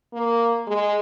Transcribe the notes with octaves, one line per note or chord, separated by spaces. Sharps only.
A#3
G#3